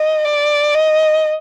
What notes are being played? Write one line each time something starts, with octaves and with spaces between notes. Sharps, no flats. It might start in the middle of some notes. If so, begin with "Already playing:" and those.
Already playing: D#5
D5
D#5